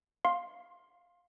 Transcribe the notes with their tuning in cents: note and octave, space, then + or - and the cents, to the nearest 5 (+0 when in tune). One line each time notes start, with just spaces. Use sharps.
F5 +10 C6 +15